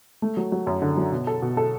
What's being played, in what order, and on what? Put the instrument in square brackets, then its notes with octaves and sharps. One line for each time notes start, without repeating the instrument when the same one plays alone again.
[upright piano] A3
F#3
F#3
F#2
D3
F#3
B2
A4
B2
A4